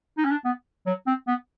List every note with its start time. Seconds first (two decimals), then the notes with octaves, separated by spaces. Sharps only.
0.17 D#4
0.25 C#4
0.31 D4
0.45 B3
0.86 F#3
1.07 C4
1.27 B3